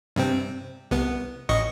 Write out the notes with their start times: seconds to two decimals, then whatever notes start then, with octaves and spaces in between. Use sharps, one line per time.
0.16 G2 C3 C4
0.91 C2 B3
1.49 A1 D#5 C#6